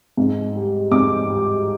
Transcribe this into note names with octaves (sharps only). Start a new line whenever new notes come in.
G#2
G3
G#2 D6
G3